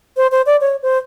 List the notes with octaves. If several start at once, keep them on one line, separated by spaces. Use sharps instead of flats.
C5
C5
D5
C#5
C5